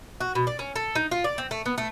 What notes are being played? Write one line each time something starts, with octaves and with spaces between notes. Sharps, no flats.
F#4
B2
D5
C#4
A4
D#4
F4
D5
C4
A3
B3
A3